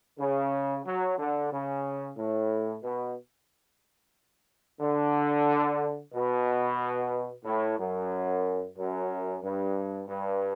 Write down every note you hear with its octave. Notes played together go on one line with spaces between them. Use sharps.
C#3
F#3
D3
C#3
A2
B2
D3
B2
A2
F#2
F#2
G2
G2